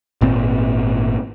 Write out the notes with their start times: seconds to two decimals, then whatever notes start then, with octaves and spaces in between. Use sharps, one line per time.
0.21 G#1 A#2 C4